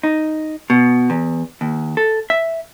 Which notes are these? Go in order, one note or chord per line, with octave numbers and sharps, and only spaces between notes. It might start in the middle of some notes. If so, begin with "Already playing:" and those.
D#4
B2
E2
D#2
A4
E5